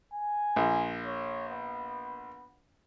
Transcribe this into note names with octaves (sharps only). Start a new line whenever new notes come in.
G#5
A#1
C#5
B3